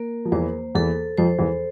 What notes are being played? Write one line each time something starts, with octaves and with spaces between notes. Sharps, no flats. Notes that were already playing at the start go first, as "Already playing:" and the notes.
Already playing: A#3 A#4
F3
E2 E3 C5
E2 E3 A4
F2 F3 C5
E2 E3